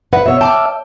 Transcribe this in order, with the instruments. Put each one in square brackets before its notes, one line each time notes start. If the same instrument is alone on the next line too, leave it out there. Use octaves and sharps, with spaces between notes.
[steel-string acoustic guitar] B4 E5 F#5
[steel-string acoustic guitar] B2 C#5 [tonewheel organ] E5
[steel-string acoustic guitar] G5 [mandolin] A5 D6 F6